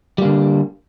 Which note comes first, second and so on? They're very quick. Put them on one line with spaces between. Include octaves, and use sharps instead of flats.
G3 A#3 D3